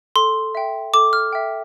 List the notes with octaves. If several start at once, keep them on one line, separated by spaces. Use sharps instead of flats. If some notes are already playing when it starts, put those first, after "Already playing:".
A4 C6
E5 G5
A4 D6
F6
E5 G5